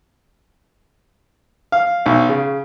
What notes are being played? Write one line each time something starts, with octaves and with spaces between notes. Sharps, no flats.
F5
B1
C#3